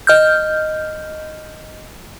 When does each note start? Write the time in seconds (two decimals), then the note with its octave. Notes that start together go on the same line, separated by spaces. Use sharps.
0.07 D#5 F6 G6